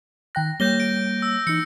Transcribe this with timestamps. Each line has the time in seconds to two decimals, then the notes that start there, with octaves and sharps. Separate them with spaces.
0.35 D#3 G5 F#6 A#6
0.60 G3 A#3 C#5 G6 A#6 G7
0.80 D7
1.22 E6
1.47 E3 D#4 C#7